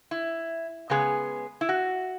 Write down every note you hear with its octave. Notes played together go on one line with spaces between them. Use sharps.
E4
C#3 G#3 B3 G#4
E4
F#4